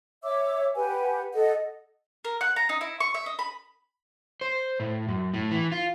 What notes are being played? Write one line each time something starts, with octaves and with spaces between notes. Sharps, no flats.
C#5 E5 D6 E6
G4 B4 F#5 G#5
A4 D#5 F#5
A#4
F#5
A#5
D#4
E4
C#6
E5
D#5
B5
C5
A2
F#2
A2
E3
F4